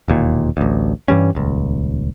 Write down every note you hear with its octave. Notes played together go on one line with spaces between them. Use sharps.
E1 D#2 A#2
A1 D2
G2 E3 G3 C#4
D#1 C#2